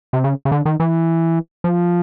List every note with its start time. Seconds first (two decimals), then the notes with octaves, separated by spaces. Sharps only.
0.13 C3
0.24 C#3
0.45 C#3
0.52 D3
0.65 D#3
0.80 E3
1.64 F3